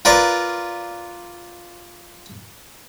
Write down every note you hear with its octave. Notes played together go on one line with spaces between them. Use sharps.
F4 A#4 B4 D5